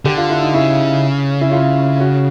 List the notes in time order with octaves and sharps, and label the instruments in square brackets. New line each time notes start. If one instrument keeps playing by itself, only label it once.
[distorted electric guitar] D3 [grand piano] G4
[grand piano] F4
E4
D#4
[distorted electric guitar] C#3 [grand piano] E4
[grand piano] E4
F4
F#4